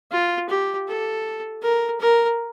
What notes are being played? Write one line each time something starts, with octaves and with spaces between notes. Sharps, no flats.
F4
G4
A4
A#4
A#4